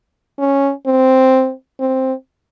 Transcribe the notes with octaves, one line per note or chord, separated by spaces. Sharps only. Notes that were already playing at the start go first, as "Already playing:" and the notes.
C#4
C4
C4